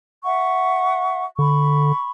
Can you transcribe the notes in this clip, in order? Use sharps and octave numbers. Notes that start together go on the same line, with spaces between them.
E5 F#5 C#6
D3 B5 C#6